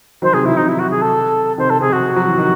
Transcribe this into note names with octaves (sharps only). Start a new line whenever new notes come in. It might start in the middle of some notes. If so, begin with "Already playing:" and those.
D#3 F#3 C5
C3 D#3 G#4
D#3 F#3 E4
C3 D#3 D#4
E4
F#4
G#4
A4
C3 D#3 C5
A4
C3 G#4
F#4
F#3
E3
D#3